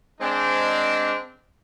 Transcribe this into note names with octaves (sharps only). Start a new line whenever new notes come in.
G#3 C4 D4